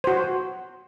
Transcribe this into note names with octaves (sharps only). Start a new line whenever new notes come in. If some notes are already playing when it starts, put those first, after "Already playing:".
F#4 C5